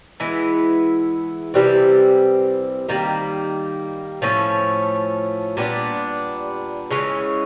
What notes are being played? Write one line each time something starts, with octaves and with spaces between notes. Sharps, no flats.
E3 G#3 B3 E4
C3 E3 G3 C4
D#3 G3 A#3
A2 F3 A3 C#4
A#2 G3 B3 D4
C#3 E3 G#3 C#4